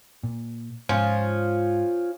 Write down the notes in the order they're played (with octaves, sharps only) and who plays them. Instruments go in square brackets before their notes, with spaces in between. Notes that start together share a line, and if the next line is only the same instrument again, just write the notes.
[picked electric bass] A#2
[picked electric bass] G#2 [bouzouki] F3 C#4 F4